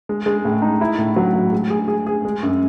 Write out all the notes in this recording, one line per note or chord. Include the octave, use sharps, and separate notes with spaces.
G#3
G#3
A2
D#4
E4
A2
F#3
A2
G#3
G#4
G#4
G#4
G#3
F#2